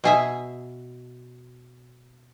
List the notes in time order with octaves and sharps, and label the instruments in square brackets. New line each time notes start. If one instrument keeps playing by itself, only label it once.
[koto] B2 G#4 E5